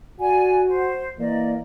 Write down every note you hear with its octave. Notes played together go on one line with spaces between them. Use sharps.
F#4 D5 G#5
C5
E3 A#3 D5 D#5